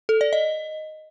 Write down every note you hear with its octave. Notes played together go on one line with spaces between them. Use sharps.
A4
D5
D#5